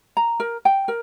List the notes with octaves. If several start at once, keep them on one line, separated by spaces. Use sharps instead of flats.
A#5
A#4
G5
A#4